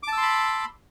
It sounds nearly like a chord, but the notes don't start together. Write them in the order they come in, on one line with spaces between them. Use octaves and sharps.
D6 A5 E6 C6 B5